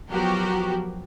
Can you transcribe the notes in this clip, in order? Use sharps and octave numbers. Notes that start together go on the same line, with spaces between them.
F3 F#3 B3 F#4 G4 A#4